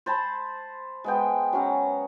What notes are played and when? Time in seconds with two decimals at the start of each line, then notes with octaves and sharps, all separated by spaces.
0.06 C5 A5 B5
1.04 G#3 B3 G5
1.53 F#3 C#4